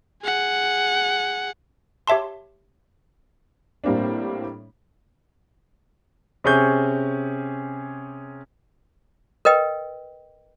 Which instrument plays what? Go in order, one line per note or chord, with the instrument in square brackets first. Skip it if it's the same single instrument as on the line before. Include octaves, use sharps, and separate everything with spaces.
[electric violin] G#4 F#5
[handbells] G4 C#5 E5 A5 C6
[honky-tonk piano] A2 G3 A#3 C4 D4
[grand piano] C3 C#4 G#4 C#6 G6
[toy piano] A#4 B4 D#5 G5